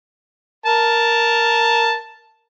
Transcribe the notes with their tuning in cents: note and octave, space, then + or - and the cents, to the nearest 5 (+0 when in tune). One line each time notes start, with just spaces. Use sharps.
A#4 +0 A5 +0